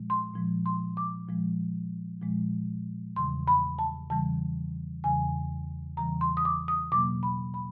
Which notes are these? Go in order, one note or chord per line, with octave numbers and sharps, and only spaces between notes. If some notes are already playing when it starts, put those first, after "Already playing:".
Already playing: A#2 F3 G#3
C6
A#2 F3 G#3
C6
D6
A#2 F3 G#3
A#2 F3 G#3
E2 C#3 E3 G3 C6
B5
A5
E2 C#3 E3 G3 A5
E2 C#3 E3 G3 G#5
E2 C#3 E3 G3 A#5
C6
D#6
D6
D#6
B2 F#3 A#3 D6
B5
B5